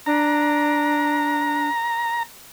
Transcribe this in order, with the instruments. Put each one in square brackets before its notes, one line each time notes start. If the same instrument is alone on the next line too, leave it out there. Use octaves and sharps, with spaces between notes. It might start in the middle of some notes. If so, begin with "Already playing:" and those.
[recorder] D4 [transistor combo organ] A#5